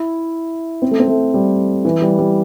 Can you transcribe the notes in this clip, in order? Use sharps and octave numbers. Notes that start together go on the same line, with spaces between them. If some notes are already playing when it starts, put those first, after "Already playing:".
Already playing: E4
C4
A3
C4
A3
G3
E3
G3
G3